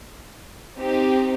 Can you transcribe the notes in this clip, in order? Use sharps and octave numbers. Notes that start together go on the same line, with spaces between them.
C4 D#4 G4